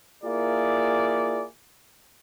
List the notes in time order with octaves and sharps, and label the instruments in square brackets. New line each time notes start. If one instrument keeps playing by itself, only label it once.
[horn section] A#3 E4 F4 G#4 A#4 D5